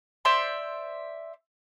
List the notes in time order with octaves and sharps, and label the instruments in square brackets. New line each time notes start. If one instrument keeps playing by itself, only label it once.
[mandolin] C5 D5 E5 C6